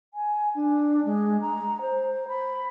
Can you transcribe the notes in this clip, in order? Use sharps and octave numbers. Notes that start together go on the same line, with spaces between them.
G#5
D4
G#3
A#5
C5
B5